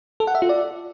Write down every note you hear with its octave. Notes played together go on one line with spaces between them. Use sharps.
A4
F#5
E5
F4
D5